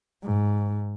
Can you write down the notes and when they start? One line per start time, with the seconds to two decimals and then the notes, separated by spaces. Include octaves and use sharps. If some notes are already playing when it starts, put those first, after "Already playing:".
0.23 G#2